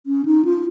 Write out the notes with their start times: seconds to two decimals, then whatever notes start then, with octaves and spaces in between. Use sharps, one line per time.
0.06 C#4
0.25 D#4
0.45 F4